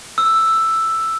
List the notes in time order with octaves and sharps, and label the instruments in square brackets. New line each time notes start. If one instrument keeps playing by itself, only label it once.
[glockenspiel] E6